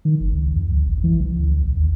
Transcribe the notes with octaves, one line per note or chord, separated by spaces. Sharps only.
D#3
G1
C#2
F2
D2
A1
E3
C2
D2
A#1
D#2